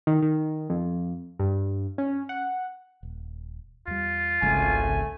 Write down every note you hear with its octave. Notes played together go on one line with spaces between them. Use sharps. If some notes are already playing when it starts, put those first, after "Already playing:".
D#3
D#3
F2
G2
C#4
F#5
D#1
E2 G3 F4
G#1 C#2 C#3 A3 G#5